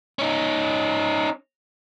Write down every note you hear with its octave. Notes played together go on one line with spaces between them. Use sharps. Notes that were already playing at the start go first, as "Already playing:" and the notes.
C#4 D#4